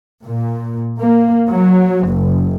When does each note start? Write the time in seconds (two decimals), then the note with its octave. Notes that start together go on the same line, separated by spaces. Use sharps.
0.25 A#2
1.01 A#3
1.51 F#3
2.07 F#1